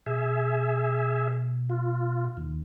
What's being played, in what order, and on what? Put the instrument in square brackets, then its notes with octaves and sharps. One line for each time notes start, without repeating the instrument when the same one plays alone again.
[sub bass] B2 [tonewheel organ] G#4 E5
[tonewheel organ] F4
D#2